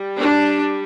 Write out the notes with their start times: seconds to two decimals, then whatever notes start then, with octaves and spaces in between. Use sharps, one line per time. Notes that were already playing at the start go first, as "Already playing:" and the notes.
Already playing: G3
0.18 D4